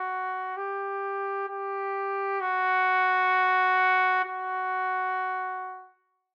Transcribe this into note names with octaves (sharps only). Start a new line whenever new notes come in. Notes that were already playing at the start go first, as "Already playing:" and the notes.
Already playing: F#4
G4
G4
F#4
F#4